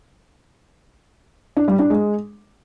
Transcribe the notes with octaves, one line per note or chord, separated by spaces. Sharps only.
D4
G3
D4
G#3